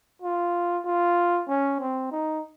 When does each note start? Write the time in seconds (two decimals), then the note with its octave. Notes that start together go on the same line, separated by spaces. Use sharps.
0.22 F4
0.85 F4
1.48 C#4
1.80 C4
2.11 D#4